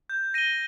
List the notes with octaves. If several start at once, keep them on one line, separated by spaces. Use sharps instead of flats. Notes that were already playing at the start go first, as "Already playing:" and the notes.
G6
A#6 D#7 G7